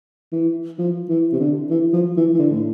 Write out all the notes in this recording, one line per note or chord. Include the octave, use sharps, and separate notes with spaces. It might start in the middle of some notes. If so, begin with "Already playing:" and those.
E3
F3
E3
C3
D3
E3
F3
E3
E3
D3
A2